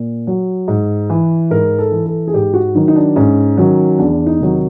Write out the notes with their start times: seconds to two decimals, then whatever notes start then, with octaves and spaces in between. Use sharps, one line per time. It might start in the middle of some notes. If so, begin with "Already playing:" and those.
Already playing: A#2
0.27 F#3
0.68 G#2
1.10 E3
1.50 G#2 A#4
1.79 A4
1.91 E3
2.06 A4
2.27 G#4
2.33 G#2 G4
2.54 F#4
2.75 D#3 F#3 D#4
2.88 D#4
2.96 D4
3.16 G#2 C#4
3.58 D#3 F#3
3.98 E2 D4
4.27 D#4
4.40 C3 D#3 F#3